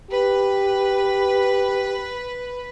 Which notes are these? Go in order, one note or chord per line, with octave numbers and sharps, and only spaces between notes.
G4 B4